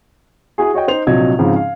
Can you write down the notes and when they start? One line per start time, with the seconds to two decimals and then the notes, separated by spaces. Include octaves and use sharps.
0.58 E4 F#4 G#4
0.74 F#4 C#5 D#5 G5
0.88 D#4 C5 F7
1.07 A#1 C3 F#3 D#5 G#6
1.39 G#2 C#3 F3 C4
1.56 F5